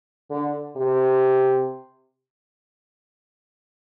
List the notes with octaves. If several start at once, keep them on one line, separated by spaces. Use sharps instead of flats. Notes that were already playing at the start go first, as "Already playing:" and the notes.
D3
C3